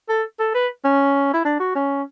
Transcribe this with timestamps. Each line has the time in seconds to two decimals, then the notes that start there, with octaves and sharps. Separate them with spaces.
0.09 A4
0.39 A4
0.54 B4
0.84 C#4
1.33 E4
1.45 D4
1.60 F#4
1.75 C#4